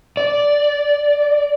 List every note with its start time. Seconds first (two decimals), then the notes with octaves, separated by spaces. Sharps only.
0.17 D5